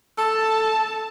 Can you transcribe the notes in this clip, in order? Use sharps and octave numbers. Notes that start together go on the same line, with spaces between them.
A4 A5